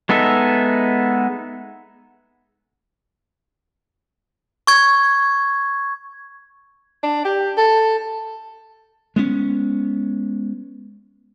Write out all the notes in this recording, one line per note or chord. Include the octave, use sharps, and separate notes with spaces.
G#3 B3 D#4 A4 E5
C#6 G#6
D4
G4
A4
G#3 B3 C#4